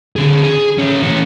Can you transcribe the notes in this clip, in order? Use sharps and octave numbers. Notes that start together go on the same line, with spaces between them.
D3 G#4
G#4
C#4 G4
E3 C#5